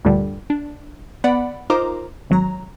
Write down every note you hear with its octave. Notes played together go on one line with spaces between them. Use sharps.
D2 G2 A#2 D3 G3
D4
B3 D5 F#5 B5
D#4 F4 A#4 C5 A#5 D6
G#1 F#3 A#5